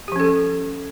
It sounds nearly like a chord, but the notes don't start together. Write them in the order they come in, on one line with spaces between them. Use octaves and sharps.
G4 F3 C#4 A4